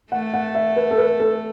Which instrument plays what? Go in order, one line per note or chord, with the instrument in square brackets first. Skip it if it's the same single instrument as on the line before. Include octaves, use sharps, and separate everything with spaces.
[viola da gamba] A3 [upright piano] F#5
[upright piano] F#5
E5
B4
A4
B4
A4